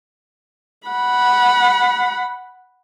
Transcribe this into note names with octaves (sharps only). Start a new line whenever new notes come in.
F#5 B5